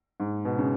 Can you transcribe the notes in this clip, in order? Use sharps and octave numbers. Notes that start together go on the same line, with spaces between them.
G#2
B2
C#3